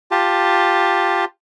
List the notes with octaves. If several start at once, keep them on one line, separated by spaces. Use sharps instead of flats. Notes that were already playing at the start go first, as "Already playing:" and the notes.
F4 G4 A5